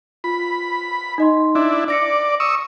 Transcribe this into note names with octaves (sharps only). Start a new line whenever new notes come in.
F4 B5
D#4 D#5 C6
D4 E4
D5 D6 A#6 C#7
C#6 D#6 E6